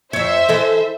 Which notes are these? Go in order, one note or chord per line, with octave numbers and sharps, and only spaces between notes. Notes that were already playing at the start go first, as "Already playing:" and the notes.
F2 C5 C#5 E5
E3 A4 D#5